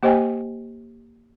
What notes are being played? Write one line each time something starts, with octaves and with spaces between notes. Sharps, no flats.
A#3 G4 C5 D#5 G5 G#5